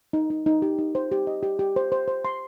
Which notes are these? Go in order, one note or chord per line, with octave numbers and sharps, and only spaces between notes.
D#4
D#4
D#4
G4
D#4
C5
G4
D#5
G4
G4
C5
C5
C5
C6